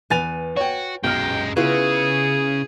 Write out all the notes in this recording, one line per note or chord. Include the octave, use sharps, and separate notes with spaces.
E2 B4 G#5 A6 F7
F#4 C#5 G5
B1 F#2 G#3 G5 F6
C#3 B3 E4 F4 G#4 B4